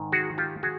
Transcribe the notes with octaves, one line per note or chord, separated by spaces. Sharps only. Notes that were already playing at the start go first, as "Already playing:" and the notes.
Already playing: G#2 D#3
F#4 G#4
F4 G4
F#4 G#4